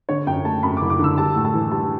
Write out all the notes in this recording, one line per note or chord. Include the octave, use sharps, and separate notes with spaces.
D3 C#5
F#2 G5
A3 A5
F#2 B5
D6
F#1
D6
D3 E6
G3 A5
A2
A5
E3
G3 A5